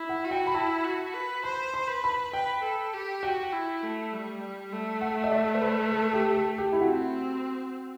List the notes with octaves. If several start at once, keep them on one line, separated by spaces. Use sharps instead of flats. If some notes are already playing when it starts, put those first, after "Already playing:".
Already playing: E4
F#5
F#4
G5
B5
E4 A5
F#4
B4
C5 B5
C6
B4
B5
B4 G5
A4
G4
F#4 G5
E4
A3
G3
G3
A3
F#5
E5
D5
C5
B4
A4
G4
A4
G4
E4
C4 F#4